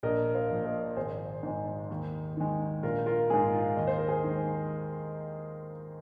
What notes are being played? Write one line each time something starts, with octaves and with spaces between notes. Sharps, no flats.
A#1 A#4 D#5
C5 F5
A#2 F3
A#4 D#5
G#1 G#4 C5
G#2 G#3
D#2
D#3 G#3
A#1 F4 A#4
F4 A#4
G#2 G#3 G#4
F4
D#2 D#5
C5
A#4
G#4 C5
D#3 G#3